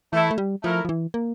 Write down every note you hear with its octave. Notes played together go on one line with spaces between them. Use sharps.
E3 A3 E4 A4
A3
G3
F3 A3 E4 A#4
F3
E3
A#3